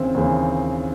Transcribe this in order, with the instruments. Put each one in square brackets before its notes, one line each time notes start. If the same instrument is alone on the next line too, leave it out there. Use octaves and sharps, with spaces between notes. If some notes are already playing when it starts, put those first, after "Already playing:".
Already playing: [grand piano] D#2 C#3 E3 C4 C5
D#2 C#3 E3